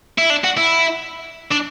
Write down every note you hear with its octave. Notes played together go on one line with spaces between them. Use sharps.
E4
D4
F#4
E4
D4